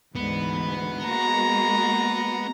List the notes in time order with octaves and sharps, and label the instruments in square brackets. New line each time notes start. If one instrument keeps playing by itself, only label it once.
[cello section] D2 G#2 E3 [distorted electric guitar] B3
[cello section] G#3 A#3 F#4 [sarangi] A#5